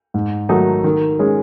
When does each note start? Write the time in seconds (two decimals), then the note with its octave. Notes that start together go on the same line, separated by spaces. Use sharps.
0.14 G#2
0.49 D#3 F#3 A3 D#4
0.84 D#3
1.19 G#3 C#4